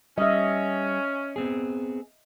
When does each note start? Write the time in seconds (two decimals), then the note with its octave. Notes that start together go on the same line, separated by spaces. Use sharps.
0.18 G3 C#4 D#5 E5
1.36 B3 C4 G#4